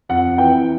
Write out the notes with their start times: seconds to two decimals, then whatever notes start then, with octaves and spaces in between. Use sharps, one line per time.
0.09 F2 F#5
0.38 E3 G5